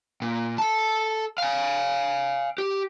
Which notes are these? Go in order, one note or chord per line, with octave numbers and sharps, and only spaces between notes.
A#2
A4 A5
F5 G#5
G4